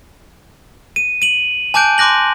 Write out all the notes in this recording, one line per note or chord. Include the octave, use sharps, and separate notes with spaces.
D#7
D#7 F#7
G#5 A5 D6 F#6 G6 D7
C6 D6 F#6 A#6 F#7